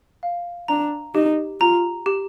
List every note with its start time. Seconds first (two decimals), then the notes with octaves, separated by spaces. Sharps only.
0.23 F5
0.68 D4 A#5
1.15 D#4 G4
1.60 F4 A#5
2.06 G4